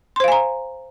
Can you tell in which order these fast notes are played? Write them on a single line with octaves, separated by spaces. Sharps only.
C6 C5 F5 G#5 A#5